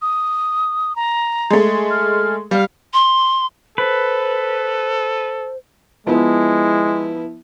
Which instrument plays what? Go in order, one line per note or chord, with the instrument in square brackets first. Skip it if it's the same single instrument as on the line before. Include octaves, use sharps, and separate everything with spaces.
[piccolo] D#6
A#5
[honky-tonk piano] G#3 A3
[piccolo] F6
[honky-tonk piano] G3 [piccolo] F5
[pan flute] C6
[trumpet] A4 [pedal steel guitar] B4 [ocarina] C5
[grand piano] F3 B3 [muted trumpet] G#3 [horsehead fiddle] E4